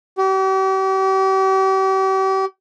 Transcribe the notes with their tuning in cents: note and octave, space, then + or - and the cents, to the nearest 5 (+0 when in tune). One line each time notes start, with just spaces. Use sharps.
G4 -40